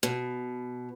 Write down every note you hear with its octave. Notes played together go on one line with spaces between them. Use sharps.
B2